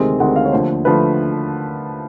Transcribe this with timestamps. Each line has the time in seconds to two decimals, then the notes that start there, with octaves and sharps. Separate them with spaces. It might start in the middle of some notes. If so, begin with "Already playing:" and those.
Already playing: D2 C3 D#3 G#3 C4
0.20 D2 C3 D#3 G#3 C4 F#5
0.36 F5
0.45 C#5
0.52 D#2 D3 F3 A3 C5
0.85 D3 F3 A3 B4